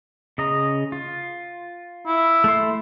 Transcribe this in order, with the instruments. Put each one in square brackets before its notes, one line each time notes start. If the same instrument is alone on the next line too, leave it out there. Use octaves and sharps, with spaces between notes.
[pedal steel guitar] C#3 D#5 A#5
F4
[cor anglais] E4
[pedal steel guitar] A3 C6